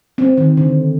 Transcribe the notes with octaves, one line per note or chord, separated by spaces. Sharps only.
C4
D#3
D3